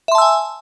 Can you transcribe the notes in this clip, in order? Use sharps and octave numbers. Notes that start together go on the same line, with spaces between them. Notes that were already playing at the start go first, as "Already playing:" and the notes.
E5 G#5 A5 C6 E6